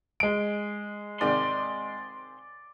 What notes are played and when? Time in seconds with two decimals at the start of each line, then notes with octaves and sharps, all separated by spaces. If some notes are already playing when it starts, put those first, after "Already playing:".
0.20 G#3 D7
1.21 G#2 C3 D#3 D5 C6